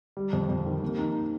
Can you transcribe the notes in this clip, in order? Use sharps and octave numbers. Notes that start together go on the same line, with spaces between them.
G3
F2
F2
D#3
A#3
D#4